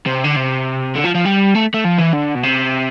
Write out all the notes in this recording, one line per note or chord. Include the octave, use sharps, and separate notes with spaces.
C3
D3
C3
D3
F3
F3
G3
A3
A3
F3
E3
D3
B2
C3